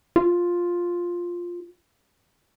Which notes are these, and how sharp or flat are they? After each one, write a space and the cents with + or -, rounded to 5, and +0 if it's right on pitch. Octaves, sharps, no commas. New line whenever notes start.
F4 +5